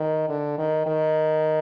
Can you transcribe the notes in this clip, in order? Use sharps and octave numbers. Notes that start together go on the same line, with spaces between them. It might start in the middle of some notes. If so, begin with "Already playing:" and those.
Already playing: D#3
D3
D#3
D#3